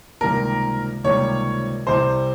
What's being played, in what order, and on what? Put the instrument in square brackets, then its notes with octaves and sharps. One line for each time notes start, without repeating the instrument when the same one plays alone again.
[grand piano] C#2 C3 D#3 G3 A#3 [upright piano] A#4
[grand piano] C#2 C3 D#3 G3 A#3 [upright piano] C#5
[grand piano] C2 C3 G3 [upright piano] C5